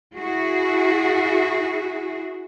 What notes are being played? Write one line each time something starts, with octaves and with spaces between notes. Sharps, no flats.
E4 F#4 G#4